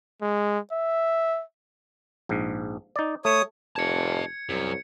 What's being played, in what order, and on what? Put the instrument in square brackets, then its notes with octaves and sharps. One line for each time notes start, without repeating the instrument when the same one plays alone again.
[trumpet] G#3
E5
[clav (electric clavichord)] A#1 G#2
D#4 D5
[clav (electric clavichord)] A3 [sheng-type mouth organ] C#5 D#6
[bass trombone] F1 [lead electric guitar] D#5 A5 [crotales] G#6 C#7
[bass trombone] C2 [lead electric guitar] F#2